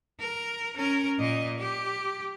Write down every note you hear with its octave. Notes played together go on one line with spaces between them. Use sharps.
A#4
C#4 A#4
A#2 D#5
G4